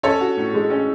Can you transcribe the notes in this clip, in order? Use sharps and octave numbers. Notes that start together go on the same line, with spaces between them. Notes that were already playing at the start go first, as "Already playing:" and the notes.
C#4 A4 C#5
F#4
A2
G#3
C#4